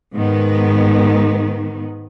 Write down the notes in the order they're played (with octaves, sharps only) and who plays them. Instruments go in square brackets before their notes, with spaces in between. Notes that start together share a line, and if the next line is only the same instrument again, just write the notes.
[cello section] G#2 D#3 B3